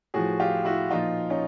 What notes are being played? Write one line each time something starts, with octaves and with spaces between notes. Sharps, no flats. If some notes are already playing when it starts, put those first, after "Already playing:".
A2 F3 F#4 G#4
F4 G4
E4 F#4
A#2 F3 D#4 F4
C#4 D#4